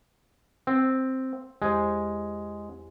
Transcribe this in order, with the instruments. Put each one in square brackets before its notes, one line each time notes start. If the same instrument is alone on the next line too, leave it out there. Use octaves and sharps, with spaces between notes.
[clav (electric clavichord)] C4
[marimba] E2 G4 C5 [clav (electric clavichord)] G#3